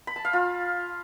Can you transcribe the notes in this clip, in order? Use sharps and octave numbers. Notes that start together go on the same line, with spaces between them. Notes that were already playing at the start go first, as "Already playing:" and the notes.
B5
A5
F5
F4